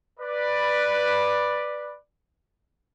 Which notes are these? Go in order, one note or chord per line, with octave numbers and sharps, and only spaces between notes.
B4 D5